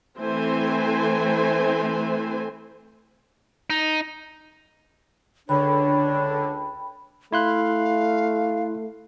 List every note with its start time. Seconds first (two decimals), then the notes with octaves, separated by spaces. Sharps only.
0.20 E3 A3 C4 A4 C5 G#5
3.70 D#4
5.49 C#2 D3 D4 C#5 G5 B5
7.32 A3 E4 F5 C6 F#6